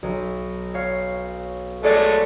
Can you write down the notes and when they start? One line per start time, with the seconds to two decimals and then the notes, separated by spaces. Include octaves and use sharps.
0.03 B1
0.74 C#5 F5
1.83 G#3 A3 B4 C#5 D5